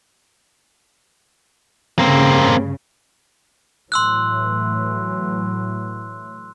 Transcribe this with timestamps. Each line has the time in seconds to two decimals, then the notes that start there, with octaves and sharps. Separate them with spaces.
1.99 G2 C#3 A#3 C4
3.92 A2 E3 F#3 C6 E6 F#6